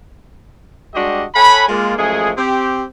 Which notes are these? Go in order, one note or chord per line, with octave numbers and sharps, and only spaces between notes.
G3 G#3 D4 F#4 G4 D#5
A4 C#5 F#5 G#5 B5
G#3 A#3 F4
F#2 F3 G#3 A3 G#4
C4 G4